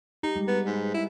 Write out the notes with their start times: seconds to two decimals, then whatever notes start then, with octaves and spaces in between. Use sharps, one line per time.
0.23 D#4 G4
0.36 G3 G#3
0.48 B3
0.66 G#2
0.94 E4